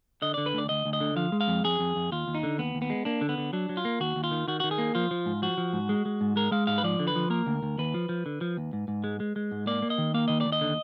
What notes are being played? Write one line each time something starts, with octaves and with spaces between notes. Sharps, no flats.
D3 D#5
D3 D5
B4
D2 D5
D2 D#5
D2
D#5
D3
F3 F5
G#3
F5
F2
F2 G#4
F2
F2
D#2 F4
D#2
D#4
D3
D#2 B3
D#2
B3
G#3
A#3 D4
D3
B3
D3
F#3 D4
F#3
F4
A#3
D#2 F#4
D#2
F4
D#3
D#3 F#4
D#3 F#4
G#4
A#3
F3 F4
F3
G#2
F3 F#4
F3
G#2
G#3
G#3
G#2
G#3 A#4
G#3 F5
G#2 F5
B4
F3 D5
D3
B4
F3
A#3 A#4
D2
D2
D#2 B4
F3
F3
D3
F3
D#2
G#2
G#2
G#3
G#3
G#3
G#2
A#3 D5
A#3
D#5
D#3
A#3 F5
D#3 D#5
D5
D#2
D#5
D3